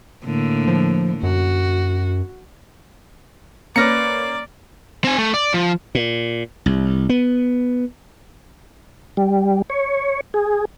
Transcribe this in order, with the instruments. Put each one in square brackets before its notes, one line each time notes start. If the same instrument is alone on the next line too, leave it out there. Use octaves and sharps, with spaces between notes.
[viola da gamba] A2 D3 A#3
[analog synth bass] F3
[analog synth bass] F#2 [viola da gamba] F#4
[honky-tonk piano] A#3 C#4 [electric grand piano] B4 A#6 C#7 [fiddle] D5 [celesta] A#5 F6
[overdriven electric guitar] C4 G#5
A3
D5
F3
[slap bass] A#2
C2
B3
[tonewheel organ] G3
C#5
G#4